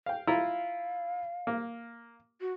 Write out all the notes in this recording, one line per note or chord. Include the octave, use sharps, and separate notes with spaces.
F5 G5
E4 F4 F5 A#5
A#3
F#4